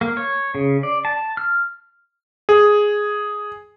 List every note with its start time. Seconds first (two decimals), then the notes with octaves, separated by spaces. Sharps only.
0.01 A#3
0.17 C#5
0.55 C#3
0.83 D5
1.05 A5
1.37 F6
2.49 G#4